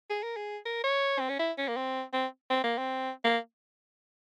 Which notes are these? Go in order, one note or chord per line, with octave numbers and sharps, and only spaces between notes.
G#4
A#4
G#4
A#4
C#5
C4
C#4
E4
C#4
A#3
C4
C4
C4
A#3
C4
A#3